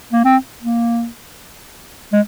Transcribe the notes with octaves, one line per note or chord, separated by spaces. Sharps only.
A#3
C4
A#3
G#3